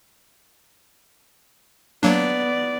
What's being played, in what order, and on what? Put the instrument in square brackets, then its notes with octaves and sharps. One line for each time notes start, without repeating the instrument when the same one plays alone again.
[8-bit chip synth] F#3 A#3 D4 [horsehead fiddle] B3 D5